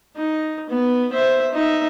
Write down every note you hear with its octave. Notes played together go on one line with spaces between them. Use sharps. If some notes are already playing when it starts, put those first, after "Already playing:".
D#4
B3
C5 E5
D#4 E5